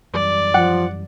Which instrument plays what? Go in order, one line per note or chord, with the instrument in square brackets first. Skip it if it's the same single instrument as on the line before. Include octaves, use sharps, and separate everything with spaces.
[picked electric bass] F#2 E3 G3 [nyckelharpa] D5
[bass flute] F3 [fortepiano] F#5